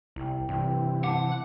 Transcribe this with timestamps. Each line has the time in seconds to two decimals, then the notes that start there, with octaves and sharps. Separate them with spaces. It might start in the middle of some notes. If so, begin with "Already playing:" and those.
0.16 C2 E4 G5
0.49 G2 C3 E3 G5
1.04 F#5 A5 D6